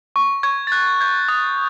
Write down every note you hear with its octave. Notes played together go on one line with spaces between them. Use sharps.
C#6
C#6 G#6
A6
F#6 G#6
G6 G#6
D#6 A6